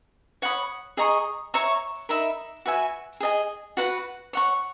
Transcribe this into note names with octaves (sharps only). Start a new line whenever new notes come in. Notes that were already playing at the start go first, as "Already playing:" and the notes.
C#5 F#5 B5 D#6
G#4 D#5 A#5 C#6
C#5 E5 A#5 C#6
D#4 A#4 E5 B5
F#4 B4 E5 G#5
G#4 D#5 G#5
F#4 B4 F#5
C#5 F#5 C#6